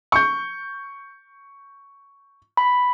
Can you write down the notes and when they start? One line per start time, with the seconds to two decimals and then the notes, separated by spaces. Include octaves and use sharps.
0.12 C#6 G6
2.57 B5